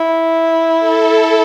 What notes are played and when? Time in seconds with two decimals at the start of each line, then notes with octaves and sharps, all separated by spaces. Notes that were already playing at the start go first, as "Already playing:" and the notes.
Already playing: E4
0.78 A4